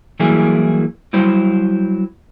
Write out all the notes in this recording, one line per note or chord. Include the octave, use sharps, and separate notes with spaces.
E3 F#3 G3 A#3 E4 G#4
F#3 G3 E4 C5